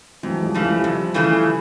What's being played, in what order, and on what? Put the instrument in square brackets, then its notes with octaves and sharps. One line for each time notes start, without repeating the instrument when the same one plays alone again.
[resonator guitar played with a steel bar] F2 [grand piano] E3 F#3
[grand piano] G#3
F3 G3
[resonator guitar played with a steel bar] C#3 E3 A3
[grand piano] F3 G3
[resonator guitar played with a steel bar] F2
C#3 E3 A3